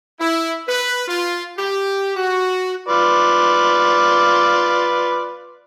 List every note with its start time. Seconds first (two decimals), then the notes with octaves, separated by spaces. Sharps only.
0.20 E4
0.67 B4
1.08 F4
1.57 G4
2.16 F#4
2.88 F4 B4 D5